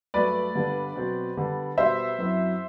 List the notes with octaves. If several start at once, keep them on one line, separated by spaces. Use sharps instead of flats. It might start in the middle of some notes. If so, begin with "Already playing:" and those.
G2 F#3 A3 B4 D5
G2 D3 G3 B3 D4
B2 F#3 C4
D3 G3 B3
B2 G3 B3 C5 E5
F#2 F#3 C4 E4